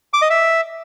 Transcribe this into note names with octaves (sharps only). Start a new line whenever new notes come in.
D6
D#5
E5